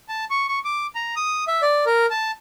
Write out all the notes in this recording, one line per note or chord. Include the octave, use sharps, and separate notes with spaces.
A5
C#6
C#6
D6
A#5
D#6
E5
D5
A#4
A5